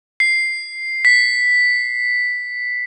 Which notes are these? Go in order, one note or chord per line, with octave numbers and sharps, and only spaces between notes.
C7
B6